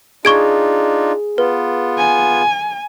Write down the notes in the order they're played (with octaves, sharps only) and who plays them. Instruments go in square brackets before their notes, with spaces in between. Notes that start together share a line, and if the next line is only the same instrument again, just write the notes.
[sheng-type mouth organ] D4 D#4 F4 [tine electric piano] G#4 [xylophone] C#6 G#6 D7
[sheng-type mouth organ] B3 F4 [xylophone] B4
[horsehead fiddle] G#5